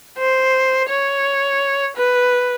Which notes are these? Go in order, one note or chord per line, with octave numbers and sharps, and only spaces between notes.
C5
C#5
B4